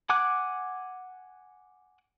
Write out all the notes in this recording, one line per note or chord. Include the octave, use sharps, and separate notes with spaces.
F#5 G#5 D6 F#6